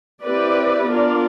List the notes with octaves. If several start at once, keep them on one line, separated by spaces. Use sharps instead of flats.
C4 E4 G4 B4 D5
B3 D4 F4 A#4 D5